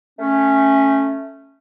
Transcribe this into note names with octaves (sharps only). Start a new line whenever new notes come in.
A3 C#4